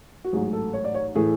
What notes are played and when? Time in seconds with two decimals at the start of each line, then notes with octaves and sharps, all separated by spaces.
0.24 F#4
0.33 A1 G#2 F#3 G#4
0.53 A4
0.73 C#5
0.84 D5
0.94 C#5
1.15 A2 E3 A3 G#4